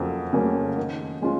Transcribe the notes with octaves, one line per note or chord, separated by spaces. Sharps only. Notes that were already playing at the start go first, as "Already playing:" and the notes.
Already playing: F2 C#3 F#3 A#3
C#3 F#3 A#3 C#4
D#3
G#3 C#4 F4